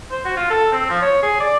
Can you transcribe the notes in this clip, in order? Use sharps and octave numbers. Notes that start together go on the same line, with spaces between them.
C5
F#4
F4
A4
C4
F3
C#5
G#4
D5